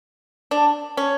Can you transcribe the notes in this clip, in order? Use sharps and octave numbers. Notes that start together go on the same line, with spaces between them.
D4
C#4